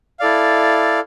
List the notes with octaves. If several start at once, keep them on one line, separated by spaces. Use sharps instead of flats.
E4 A4 D5 F5